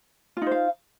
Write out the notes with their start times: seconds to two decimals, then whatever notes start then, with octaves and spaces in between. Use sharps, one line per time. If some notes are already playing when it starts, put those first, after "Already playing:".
0.37 F4
0.42 D#4
0.47 C5
0.51 F5